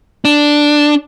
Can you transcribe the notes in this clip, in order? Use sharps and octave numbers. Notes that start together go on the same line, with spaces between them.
D4